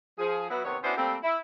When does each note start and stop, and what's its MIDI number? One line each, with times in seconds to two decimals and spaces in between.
0.19 0.47 53
0.19 0.47 68
0.49 0.60 54
0.49 0.60 59
0.49 0.60 64
0.64 0.76 39
0.64 0.76 48
0.64 0.76 59
0.64 0.76 73
0.83 0.93 59
0.83 0.93 61
0.83 0.93 62
0.83 0.93 64
0.83 0.93 66
0.83 0.93 72
0.96 1.16 55
0.96 1.16 57
0.96 1.16 58
0.96 1.16 60
1.22 1.36 64